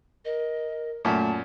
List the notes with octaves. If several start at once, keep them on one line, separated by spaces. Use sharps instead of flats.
A#4 D#5
F#2 A#2 A3 A5